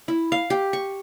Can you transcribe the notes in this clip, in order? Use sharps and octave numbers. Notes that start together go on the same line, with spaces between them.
E4
F5
G4
C#6